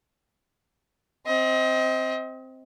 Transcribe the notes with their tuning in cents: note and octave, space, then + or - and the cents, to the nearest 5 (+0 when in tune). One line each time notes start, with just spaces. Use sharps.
C4 +0 D#5 +30